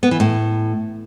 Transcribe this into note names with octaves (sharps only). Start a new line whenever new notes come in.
B3
E3
A2